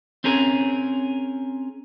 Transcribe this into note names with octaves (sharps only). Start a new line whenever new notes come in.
C4 C#4 G#4 A#4